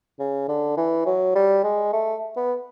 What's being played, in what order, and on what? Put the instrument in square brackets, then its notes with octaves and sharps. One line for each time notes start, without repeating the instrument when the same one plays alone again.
[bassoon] C#3
D3
E3
F#3
G3
G#3
A3
B3